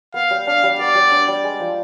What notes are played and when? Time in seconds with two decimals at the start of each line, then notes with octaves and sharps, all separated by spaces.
0.14 B3 F5
0.31 G3
0.47 D4 F5
0.63 G3
0.79 B3 D5
0.95 G3
1.11 D4
1.28 G3
1.44 G#3
1.60 F3